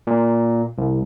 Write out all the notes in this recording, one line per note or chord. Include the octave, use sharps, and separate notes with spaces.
A#2
C2